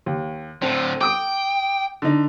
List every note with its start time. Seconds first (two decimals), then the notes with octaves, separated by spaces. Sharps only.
0.06 D#2
0.62 A2 D3 C4
1.01 G5 D6 D#6 D7
2.02 D3 D#4